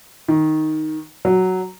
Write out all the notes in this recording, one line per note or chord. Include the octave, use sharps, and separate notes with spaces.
D#3
F#3